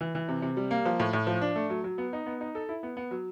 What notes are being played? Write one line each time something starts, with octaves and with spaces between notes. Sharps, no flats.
E3
E3
C3
C3
G3
A#3
F3
A2
A2
F3
D4
A3
F#3
F#3
B3
D#4
B3
D#4
A4
E4
B3
B3
F#3